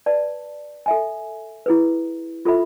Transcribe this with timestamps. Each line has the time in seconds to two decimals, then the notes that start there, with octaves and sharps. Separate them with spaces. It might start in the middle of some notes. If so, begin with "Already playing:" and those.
0.06 B4 D5 A5
0.86 A4 E5 G#5
1.66 E4 G#4 B4
2.45 F4 A4 E5 B5